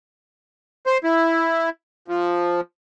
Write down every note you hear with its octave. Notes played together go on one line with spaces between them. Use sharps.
C5
E4
F3